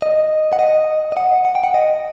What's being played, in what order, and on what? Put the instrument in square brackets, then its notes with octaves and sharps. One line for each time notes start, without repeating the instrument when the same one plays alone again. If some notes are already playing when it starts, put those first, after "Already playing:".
[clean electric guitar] D#5
F#5
D#5
D#5
F#5
F#5
G5
F#5
D#5